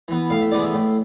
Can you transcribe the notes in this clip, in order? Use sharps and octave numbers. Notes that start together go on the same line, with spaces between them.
E3 B3
A2 F5
E5
E3 G#3 B3 D5
E5
A2